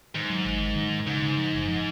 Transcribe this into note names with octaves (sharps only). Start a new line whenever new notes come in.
G#2 D#3
F#3
G#1
D#3
D#3
D#3
G#2 C#3
C#3
F3
F#1
F3